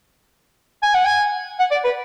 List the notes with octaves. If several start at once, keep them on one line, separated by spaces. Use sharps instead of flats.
G#5
F#5
G#5
F#5
D5
B4